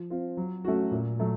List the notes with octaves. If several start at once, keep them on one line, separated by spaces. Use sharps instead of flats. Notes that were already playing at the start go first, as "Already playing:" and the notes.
Already playing: F3
C4 F4
F#3
A3 C#4 F#4
A#2
F#3 A3